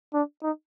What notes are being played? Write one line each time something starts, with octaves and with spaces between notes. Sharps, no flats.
D4
D#4